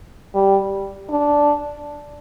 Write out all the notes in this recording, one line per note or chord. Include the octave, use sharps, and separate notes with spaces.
G3
D4